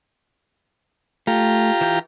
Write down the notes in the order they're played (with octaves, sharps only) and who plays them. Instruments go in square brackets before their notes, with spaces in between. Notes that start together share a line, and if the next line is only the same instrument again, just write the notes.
[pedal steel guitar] A3 [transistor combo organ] F4 G4 A#5
[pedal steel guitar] E3 G6